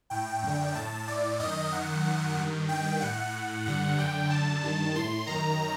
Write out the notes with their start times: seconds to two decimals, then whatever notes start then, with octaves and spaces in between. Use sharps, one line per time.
0.10 A2 G5
0.43 F#2 D3
0.75 A2 A5
1.08 A2 D5
1.39 F#2 D#3 D#5
1.72 F#2 D#3 F#5
2.04 F#2 D#3
2.37 G2 D#3
2.69 G2 D#3 G5
3.00 A2 F#5
3.33 A2 F#5
3.66 G2 D3 F#5
3.97 F#2 D3 G5
4.30 F#2 D3 A5
4.63 G2 D#3
4.95 A2 C6
5.27 F#2 D#3 A#5